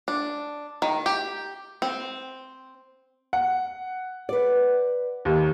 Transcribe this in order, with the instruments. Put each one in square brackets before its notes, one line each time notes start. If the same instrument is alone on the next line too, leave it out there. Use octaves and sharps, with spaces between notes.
[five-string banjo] D4
D#3
G4
C4
[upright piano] F#5
[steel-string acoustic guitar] B4 D5
[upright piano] D#2